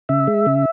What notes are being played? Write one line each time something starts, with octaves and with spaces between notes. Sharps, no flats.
C#3 E5
G#3
C#3